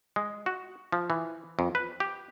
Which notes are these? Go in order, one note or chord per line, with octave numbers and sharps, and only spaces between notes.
G#3
F#4
F3
E3
F2
B4
G4